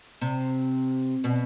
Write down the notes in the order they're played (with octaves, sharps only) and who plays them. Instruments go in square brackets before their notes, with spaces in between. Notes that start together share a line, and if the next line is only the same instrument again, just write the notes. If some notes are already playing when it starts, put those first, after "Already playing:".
[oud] C3
B2